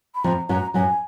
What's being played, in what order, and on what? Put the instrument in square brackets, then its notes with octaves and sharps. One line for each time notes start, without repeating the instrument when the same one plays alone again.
[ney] B5
[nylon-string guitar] F2 F3 [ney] A#5
[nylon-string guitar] F#2 F#3 [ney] A#5
[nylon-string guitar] F#2 F#3 [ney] G#5